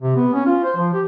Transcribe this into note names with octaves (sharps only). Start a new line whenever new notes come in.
C3
B3
C#4
F4
C5
F3
G4